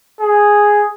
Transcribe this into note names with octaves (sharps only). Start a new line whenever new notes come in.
G#4